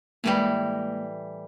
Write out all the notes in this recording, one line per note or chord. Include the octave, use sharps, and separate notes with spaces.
A2 E3 G3 G#3 A#3